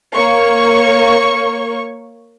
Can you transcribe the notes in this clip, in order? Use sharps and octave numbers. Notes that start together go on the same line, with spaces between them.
A#3 C#5 C#6